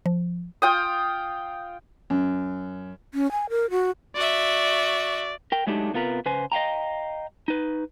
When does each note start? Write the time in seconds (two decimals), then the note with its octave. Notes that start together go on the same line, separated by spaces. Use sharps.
0.06 F3
0.62 F4 G5 D#6
2.10 F#2
3.14 C#4
3.32 G#5
3.49 A#4
3.70 F#4
4.16 F#4 D5 E5
5.52 A#4 G5
5.67 F#3 G#3 A3 D4 D#4 G4
5.93 C3 B3 F4 A#4 B4
6.26 C#3 B4 C5 G#5
6.52 D#5 F5 G5 A#5
7.48 D#4 B4